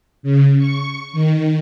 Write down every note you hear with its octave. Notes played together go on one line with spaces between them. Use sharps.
C#3
C#6
D#3